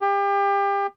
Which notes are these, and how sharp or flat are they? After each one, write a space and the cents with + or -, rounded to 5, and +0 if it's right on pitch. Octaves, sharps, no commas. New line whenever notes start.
G4 +30